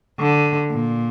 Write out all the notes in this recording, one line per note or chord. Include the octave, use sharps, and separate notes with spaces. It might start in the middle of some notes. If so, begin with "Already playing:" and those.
D3
A#2